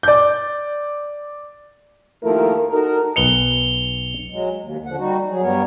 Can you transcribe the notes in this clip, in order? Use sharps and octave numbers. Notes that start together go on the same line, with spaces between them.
D5 G6
D#2 F3 A3 E4 A#4
D#4 F#4 A4 A#4
B1 B4 D#5 C#7 F7 G7
F#3 G#3
D#2
D3 F3 F#5
G3 D#4 F#4
F#3 G#4
G2 G3 B3 A#4 C#5